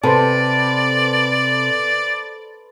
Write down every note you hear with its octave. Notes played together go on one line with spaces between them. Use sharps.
C3 A4 B4 C5 D5